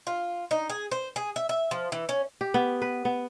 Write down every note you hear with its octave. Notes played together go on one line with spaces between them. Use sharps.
F4
D#4
G#4
C5
G#4
E5
E5
F3
E3
C#4
G4
B3
B4
B3